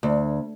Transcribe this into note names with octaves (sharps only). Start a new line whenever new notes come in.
D2